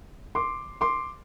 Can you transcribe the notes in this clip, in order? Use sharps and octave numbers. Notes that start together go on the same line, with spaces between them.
C6 D6
C6 D6